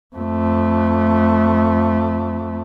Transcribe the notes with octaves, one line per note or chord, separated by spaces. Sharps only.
F2 A3